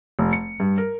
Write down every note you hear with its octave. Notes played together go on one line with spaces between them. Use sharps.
F1
C#7
G2
A#4